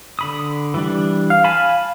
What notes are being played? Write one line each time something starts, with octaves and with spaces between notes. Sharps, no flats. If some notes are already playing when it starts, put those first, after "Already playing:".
D3 B5 D#6
E3 G3 D4
F5
G#5 A5 B5